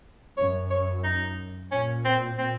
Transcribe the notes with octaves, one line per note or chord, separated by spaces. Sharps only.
F#2 C#5
C#5
D#4
A#2 C#4
C4
C4